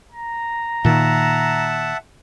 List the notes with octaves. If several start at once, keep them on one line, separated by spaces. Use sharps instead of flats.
A#5
A#2 D#3 E5 F#5 A5